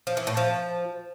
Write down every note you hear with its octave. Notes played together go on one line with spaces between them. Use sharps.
F3
E3
A2
F3